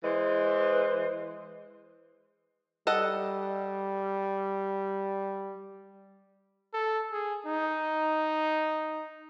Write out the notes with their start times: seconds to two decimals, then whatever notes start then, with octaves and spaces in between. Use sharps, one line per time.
0.03 E3 G#3 B4 C5
2.87 G3 A4 D#5 F#5
6.74 A4
7.12 G#4
7.46 D#4